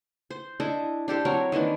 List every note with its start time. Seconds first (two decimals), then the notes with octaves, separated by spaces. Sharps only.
0.30 C5
0.60 D4 E4 A4 D#5
1.08 D4 G4 A4 C5
1.25 F#3 C4 A#4 C#5
1.52 D#3 E3 A#3 D4